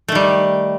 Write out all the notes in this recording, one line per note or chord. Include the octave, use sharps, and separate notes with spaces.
D#3 G3 A3